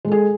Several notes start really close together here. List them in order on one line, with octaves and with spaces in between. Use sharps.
G#3 A4 G#4